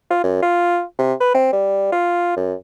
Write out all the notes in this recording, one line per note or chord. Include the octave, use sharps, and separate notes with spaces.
F4
F#2
F4
C3
B4
C4
G3
F4
F#2